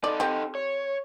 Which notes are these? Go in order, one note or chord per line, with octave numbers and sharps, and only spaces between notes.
D#4 A4 D5
C4 G4
C#5